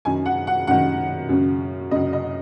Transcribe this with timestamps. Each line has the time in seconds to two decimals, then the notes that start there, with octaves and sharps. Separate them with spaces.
0.05 F#2 D#3 G#5
0.26 F#5
0.47 F#5
0.67 F#2 D#3 F#5
1.29 F#2 C#3
1.91 F#2 C#3 D#5
2.13 D#5